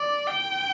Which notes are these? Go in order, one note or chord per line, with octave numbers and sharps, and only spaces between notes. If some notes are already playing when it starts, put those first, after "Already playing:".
Already playing: D5
G5